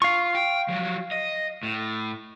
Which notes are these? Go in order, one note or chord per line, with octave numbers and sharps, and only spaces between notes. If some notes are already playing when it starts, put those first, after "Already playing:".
F4 F5 C#6
G5
F3 F#3
D#5
A2